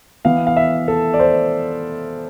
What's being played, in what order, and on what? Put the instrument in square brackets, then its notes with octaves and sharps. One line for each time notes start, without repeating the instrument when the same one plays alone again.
[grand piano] E3 B3 F5
F5
E5
A4
D5
C5